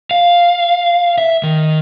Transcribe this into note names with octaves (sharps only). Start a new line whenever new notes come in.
F5
E5
D#3